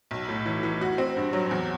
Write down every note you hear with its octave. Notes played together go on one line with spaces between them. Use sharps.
B1
A2
E3
E3
F#4
C4
G2
F#3
E2